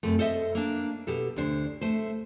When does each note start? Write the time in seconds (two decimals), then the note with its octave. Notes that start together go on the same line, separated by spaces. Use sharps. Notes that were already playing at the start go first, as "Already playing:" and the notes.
0.03 F#2 C3 A3
0.19 A4 C5 D#5 E5
0.55 A#3 D4
1.07 B2 G4 A4
1.36 D2 D3 D4 C5
1.81 A3 C5